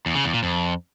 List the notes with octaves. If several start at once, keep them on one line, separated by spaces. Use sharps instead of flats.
E2
C#3
E2
A#2
F2